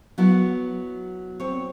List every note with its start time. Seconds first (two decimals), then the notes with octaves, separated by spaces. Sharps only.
0.18 F#3 B3 E4
1.40 C4 C#5